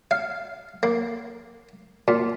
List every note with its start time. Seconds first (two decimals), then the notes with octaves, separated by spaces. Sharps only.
0.11 F5
0.83 A#3
2.08 A#2